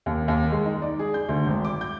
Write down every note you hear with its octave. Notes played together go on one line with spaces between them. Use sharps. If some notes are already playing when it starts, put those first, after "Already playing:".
D#2
D#2
G#3
D#4
D5
G#4
G6
D2
G#1
D6
G6